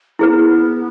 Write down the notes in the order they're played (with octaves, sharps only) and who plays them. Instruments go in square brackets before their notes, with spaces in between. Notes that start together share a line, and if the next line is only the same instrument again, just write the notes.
[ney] B3 C#4 [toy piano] E4 G#4 B4